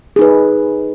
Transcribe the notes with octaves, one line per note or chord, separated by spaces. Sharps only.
D#4 G#4 B4